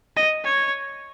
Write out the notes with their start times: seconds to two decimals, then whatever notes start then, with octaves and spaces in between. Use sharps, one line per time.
0.16 D#5
0.44 C#5